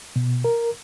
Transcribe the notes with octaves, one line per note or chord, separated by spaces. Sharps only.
B2
A#4